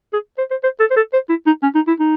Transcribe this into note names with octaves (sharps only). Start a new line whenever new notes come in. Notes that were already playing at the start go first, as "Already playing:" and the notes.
G#4
C5
C5
C5
A4
C5
A4
C5
E4
D#4
C#4
D#4
E4
D#4